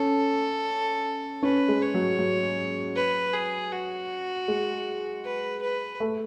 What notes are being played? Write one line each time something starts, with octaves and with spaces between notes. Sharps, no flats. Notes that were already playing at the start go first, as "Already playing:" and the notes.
Already playing: C#4 A4
C#4 B4
G#3
C#5
F#3
F#3
B4
G#4
F#4
G#3
B4
B4
A3